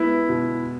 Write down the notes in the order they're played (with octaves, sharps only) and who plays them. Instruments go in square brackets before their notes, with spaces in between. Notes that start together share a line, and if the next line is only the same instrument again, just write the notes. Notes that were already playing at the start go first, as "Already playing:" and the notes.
Already playing: [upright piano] G#3 B3 [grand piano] E4
[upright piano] B2